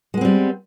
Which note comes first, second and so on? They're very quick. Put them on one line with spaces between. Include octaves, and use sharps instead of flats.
G#3 B3 C4 G3